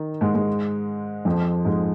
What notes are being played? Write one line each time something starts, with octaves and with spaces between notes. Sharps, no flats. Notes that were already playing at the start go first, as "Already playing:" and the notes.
Already playing: D#3 D#4
G#2 G#3
G#2 G#3
F2 F3
G#2 G#3